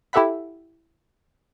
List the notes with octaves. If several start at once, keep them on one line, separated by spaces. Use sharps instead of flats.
E4 G4 A4 E5 F#5 B5